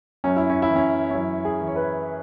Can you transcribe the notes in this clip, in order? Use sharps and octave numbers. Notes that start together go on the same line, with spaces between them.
F#2 C#4
E4
C#4
E4
E3
C#4
C#4
F#2 E4
G#4
E3
C#5
B4